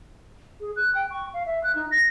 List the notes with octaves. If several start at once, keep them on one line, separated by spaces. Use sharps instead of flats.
G#4
F#6
G5
C#6
F5
E5
F#6
D#4
A#6